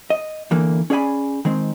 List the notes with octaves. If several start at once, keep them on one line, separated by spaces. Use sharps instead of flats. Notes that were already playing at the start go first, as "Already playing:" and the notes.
D#5
E2 D3 E3 A#3
C#4 G#4 D5 E5 G#5 B5
D#3 G#3 C4